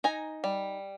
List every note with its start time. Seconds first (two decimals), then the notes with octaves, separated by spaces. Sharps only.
0.04 D#4 G#5 A#5
0.44 G3